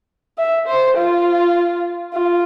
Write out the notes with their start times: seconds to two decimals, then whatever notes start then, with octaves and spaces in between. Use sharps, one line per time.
0.38 E5
0.68 C5
0.97 F4
2.14 F4